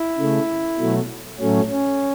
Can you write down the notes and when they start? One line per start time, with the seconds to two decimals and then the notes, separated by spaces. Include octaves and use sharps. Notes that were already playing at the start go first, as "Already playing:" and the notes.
Already playing: E4
0.17 C#3 A3
0.79 B2 F#3 A3
1.39 A2 F#3 A3 C#4
1.70 C#4